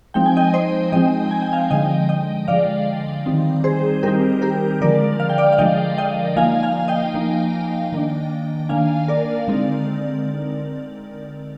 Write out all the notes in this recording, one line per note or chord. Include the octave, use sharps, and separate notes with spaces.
F3 G#3 C4 D#4 G5
G#5
D#5 G5
C5 D#5
F3 G#3 C4 D#4 D#5 G5
G#5
G5
F5 G#5
D3 F3 G#3 D#5 G5
D#5 G5
D3 F3 G#3 D5 F5
D#3 G3 C4 D#4
G#4 C5
D#3 G3 C4 D#4 G4 A#4
G4 A#4
D3 F3 G#3 A#4 D5
F5
G5
D5 F5
F5
D3 F3 G#3 D#5 G5
D#5 G5
F3 A#3 D#4 F5 G#5
F5 G#5
D#5 G5
F3 A#3 D#4
D#3 A#3 D4
D#3 A#3 D4 F5 G#5
A#4 D5
D3 G#3 C4 D#4